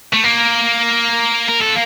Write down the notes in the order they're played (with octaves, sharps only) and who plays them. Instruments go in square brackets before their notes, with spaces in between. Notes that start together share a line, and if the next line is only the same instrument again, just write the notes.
[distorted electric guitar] A3
A#3
A#4
A4